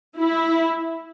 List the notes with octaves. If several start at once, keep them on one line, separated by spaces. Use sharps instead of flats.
E4